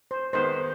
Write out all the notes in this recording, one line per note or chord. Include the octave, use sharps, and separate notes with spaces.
C5
D#3 G#3 B3 C5